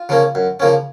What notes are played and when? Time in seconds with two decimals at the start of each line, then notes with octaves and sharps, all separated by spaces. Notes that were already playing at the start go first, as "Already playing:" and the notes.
Already playing: F4
0.09 C#3 F3 A#3 C#4
0.35 F#2
0.60 C#3 F3 A#3 C#4